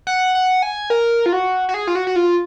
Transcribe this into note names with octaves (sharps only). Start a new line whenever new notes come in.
F#5
F#5
G#5
A#4
F4
F#4
F#4
G#4
F4
F#4
F#4
F4